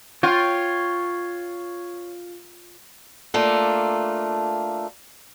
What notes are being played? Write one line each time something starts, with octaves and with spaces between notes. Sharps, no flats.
F4 C#5 G5
A3 A#3 D4 F4 A4